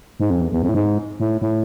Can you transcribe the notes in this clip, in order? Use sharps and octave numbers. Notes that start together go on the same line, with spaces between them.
G#2
F2
E2
E2
F2
A2
G#2
A2
A2